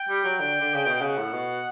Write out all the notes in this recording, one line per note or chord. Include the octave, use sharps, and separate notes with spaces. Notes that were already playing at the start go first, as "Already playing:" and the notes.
Already playing: G5
G3
F#3
D3
D3
C#3
B2
C#3 F#5
A2
B2